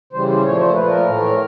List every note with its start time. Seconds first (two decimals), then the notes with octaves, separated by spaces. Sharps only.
0.13 C#3 E3 G3 C5
0.28 C5
0.43 A#2 F3 A3 C#5
0.59 C5
0.74 A#2 F3 A3 B4
0.88 A#4
1.03 A2 E3 A3